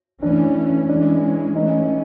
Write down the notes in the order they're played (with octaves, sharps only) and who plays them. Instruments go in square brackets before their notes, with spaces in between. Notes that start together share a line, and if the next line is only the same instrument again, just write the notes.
[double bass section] E3 A3 C#4 [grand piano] D4
[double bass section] E3 G#3 C#4 [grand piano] D4
[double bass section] E3 A3 C#4 [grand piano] D#4